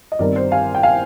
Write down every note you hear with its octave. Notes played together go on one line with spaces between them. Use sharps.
D#5
G1 G2 D#3 G3 C4 A#4 D5
C5
F5 G#5
G5
F5 G#5